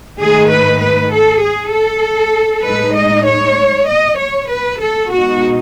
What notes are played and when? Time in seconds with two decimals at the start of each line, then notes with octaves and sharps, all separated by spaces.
0.19 G#2 D#3 A3 D#4 G#4
0.50 B4
0.80 B4
1.11 A4
1.41 G#4
1.73 A4
2.65 A2 G#3 D#4 B4
2.95 D#5
3.27 C#5
3.88 D#5
4.19 C#5
4.49 B4
4.80 A4
5.11 B2 G#3 D#4 F#4